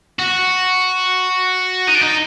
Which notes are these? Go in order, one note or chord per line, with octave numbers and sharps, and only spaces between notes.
F#4
D#4
D4
D#4